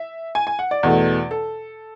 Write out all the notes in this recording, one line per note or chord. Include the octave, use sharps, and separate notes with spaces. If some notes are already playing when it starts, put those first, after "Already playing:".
Already playing: E5
G#5
G#5
F#5
D5
E2 B2 A3
A4